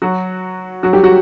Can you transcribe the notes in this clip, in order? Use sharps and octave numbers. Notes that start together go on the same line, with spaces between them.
F#3 F#4
F#3 F#4
G3 G4
F#3 F#4